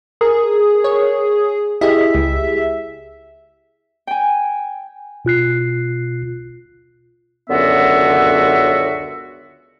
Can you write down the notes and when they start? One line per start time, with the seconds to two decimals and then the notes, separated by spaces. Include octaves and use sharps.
0.21 G#4 A#4
0.84 C#5
1.81 E4 G4 G#4 D#5 E5
2.15 C#2
4.07 G5 G#5
5.25 B2 F4 F#6 C7
7.49 C#2 F#2 D3 B3 F#4 E5